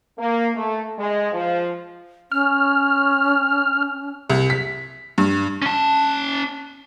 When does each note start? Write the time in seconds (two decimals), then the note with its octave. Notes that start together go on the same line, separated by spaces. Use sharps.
0.19 A#3
0.55 A3
0.98 G#3
1.33 F3
2.32 C#4 F6
4.30 C2
4.50 B6
5.18 G2
5.62 C#4 A5